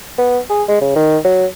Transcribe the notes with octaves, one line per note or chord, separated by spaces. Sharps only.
B3
G#4
G#3
C#3
D#3
F#3